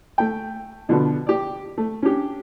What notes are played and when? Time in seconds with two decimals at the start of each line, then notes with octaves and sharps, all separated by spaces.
0.18 A3 G5
0.89 B2 D3 F3 B3 F#4
1.27 G4 D5
1.78 A3
2.02 C#4 D4 G4